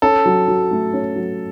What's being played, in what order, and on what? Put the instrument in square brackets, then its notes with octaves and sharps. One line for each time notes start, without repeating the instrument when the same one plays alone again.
[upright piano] C#4 [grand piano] A4
[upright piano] F#3
F#3
A3
C#4
F#3